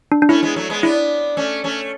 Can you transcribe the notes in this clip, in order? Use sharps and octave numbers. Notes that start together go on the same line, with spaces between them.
D4
D4
A3 C#4 E4
G#3 B3
F#3 A3
G#3 B3
B3 D4 E4
A3 C#4
A3 C#4